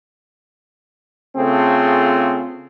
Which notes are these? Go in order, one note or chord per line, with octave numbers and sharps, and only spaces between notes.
C#3 A3 C4 F4 G#4 A4